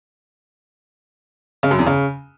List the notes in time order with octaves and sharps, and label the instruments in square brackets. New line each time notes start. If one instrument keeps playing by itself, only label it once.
[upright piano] C#3
F#2
E2
C#3